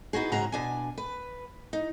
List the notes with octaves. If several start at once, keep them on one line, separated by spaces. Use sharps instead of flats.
B3 D#4 F#4 G#4
G#2 C#3 F#4 G#4 A#5
B2 D4 G#5
B4
D#4